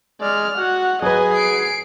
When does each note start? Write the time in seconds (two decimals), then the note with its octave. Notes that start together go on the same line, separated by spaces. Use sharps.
0.21 G#3 D5 F6
0.58 F#4 F#5
1.02 F#3 G#4 B4 D#5 G#5
1.34 C7 D7